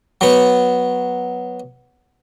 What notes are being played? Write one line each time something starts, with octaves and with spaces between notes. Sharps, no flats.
F#3 B3